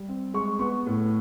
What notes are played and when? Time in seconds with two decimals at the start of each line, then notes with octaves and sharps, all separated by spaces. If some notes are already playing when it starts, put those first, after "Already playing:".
Already playing: G3
0.09 C4
0.34 G#3 C#6
0.59 B3 C#6
0.87 A2